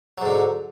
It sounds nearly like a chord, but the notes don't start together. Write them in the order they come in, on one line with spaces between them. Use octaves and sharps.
F#3 G#2 D3